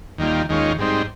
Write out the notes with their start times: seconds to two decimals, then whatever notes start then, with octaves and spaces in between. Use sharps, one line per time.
0.18 D#2 D#3 G3 A#3 F4
0.49 D#2 D#3 G#3 C#4 F4
0.78 G#2 G3 C4 D#4